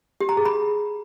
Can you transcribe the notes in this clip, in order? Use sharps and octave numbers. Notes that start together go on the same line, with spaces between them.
G4
A#5
G#4
B5